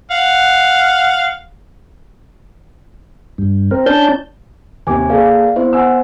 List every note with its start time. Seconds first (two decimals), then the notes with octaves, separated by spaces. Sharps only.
0.11 F5 F#5
3.38 G2
3.71 C4 A#4
3.86 C#4 D4 A5 G6
4.87 D#2 C3 G#5 D6
5.09 A#3 G#4 A4 D5 F5
5.56 B3 C4 E4 C5
5.73 F#5 G#5 E6